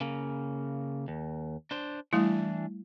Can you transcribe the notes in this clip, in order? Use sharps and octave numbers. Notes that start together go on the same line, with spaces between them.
C#3 A#3
D#2
D4 C5
E3 G3 A3 D4 E4